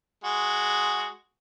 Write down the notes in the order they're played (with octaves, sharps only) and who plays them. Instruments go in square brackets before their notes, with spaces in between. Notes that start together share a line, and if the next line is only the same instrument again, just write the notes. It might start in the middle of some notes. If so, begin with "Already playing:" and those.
[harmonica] G#3 F#4